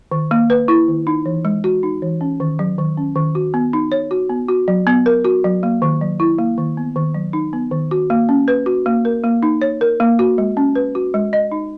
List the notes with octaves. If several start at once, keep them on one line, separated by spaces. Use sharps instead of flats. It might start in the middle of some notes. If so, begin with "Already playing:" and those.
D#3
A#3
B4
E4
D#3
D#4
E3
G#3
F#4
D#4
E3
C#4
D#3
F#3
D#3
C#4
D#3
F#4
B3
D#4
C#5
F#4
B3
F#4
F#3
B3
A#4
F#4
F#3
A#3
D#3
F#3
E4
A#3
D#3
B3
D#3
F#3
D#4
B3
D#3
F#4
A#3
C#4
B4
F#4
A#3
A#4
A#3
D#4
C#5
A#4
A#3
F#4
G#3
C#4
B4
F#4
G#3
D#5
D#4